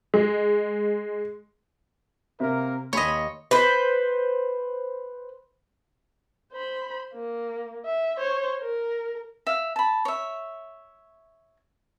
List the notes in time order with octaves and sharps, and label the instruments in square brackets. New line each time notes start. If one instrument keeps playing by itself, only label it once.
[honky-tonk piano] G#3
[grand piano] C3 C4 E5 [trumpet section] A#3 A#4
[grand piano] D#2 C6 [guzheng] C#5 D#5 [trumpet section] G#5 B5
[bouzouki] B4 C5
[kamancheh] C5 B5
A#3
E5
C5 C#5
A#4
[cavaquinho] E5 F5
A5 B5
C#5 E5